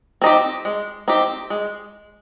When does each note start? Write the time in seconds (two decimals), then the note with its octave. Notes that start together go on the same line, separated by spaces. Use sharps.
0.22 C4 D#4 G4
0.65 G#3
1.08 C4 D#4 G4
1.50 G#3